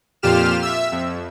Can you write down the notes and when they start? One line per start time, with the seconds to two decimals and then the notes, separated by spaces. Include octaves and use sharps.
0.22 F2 A#2 F4 G4 F6 E7
0.62 E5 E6
0.92 F2